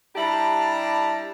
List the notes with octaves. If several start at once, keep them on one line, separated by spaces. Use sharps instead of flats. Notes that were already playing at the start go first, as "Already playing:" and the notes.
G3 D4 E4 G4 A5 A#5